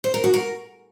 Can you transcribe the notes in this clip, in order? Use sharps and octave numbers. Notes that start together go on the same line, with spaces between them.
C5
A#4
F#4
A#4